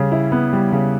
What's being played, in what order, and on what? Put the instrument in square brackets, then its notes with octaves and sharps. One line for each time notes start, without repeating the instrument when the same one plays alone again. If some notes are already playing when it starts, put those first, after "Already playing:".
Already playing: [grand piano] C#3 G3
E4
B3
G3
C#3